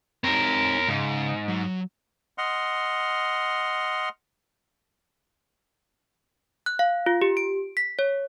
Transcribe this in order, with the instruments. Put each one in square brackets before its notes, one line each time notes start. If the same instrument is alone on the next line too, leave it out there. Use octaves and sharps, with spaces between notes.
[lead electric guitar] C4 D#4 [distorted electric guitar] A#4 C#5
[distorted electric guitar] G#2 [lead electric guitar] C#3 F5
[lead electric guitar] F#3
[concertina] D#5 F#5 C6 F6
[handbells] F#6
F5
F4
G4
D7
B6
C#5